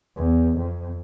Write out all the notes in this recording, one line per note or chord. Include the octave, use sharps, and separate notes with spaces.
E2
F2